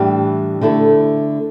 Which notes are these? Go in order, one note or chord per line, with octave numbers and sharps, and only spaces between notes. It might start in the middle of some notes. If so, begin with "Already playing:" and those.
Already playing: A2 E3 G3 D4 G4
D3 A3 E4 A4